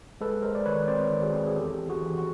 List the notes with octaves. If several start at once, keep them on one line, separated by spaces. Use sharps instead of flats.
G#3 A4 B4
G#3 A#4 C5
D5
D#3 B4 C#5
C4 C5 D5
D#3
F#4 G#4
C4
G#4
E2 G4 A4
E2
F#4 G#4
E3
F#4